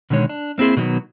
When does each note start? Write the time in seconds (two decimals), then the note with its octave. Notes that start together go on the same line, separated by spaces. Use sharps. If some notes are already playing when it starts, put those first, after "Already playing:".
0.10 B2 D3 D#3 G#3 C#5
0.29 D4
0.58 A#3 C4 E4 G#4 C5
0.77 B2 D#3 F#3 A3 B3